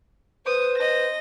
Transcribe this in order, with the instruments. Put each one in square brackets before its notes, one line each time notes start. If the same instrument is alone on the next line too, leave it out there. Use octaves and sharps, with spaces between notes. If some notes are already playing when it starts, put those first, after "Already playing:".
[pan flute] B4 [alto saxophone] C5 [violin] D#6
[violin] D#5 A#6